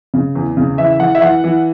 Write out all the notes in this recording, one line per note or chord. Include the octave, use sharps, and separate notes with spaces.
C#3
E2
C#3
E3 E5
E3 F#5
E5
E3 F#5
E3